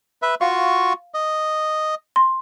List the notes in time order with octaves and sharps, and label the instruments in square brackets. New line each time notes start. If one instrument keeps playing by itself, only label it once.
[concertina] B4 E5
[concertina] F4 F#4 C#6 [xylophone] F5
[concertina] D#5
[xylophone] C6